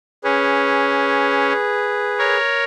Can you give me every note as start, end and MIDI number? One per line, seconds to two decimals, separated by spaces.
0.24 1.53 61
0.24 2.37 68
0.24 2.37 71
2.19 2.64 70
2.19 2.64 73